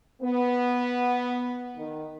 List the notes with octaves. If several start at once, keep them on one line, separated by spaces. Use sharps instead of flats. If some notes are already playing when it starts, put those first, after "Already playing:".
B3
D#3